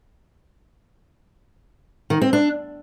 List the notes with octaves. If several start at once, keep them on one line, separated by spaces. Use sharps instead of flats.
D#3
C4
D4